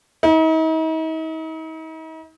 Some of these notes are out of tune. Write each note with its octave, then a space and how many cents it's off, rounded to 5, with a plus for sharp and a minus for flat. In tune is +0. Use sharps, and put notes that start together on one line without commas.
D#4 +45